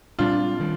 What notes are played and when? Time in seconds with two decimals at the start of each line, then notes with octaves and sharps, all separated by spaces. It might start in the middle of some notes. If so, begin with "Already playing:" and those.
0.19 A#2 G3 C4 D4 F4
0.60 D#3 G3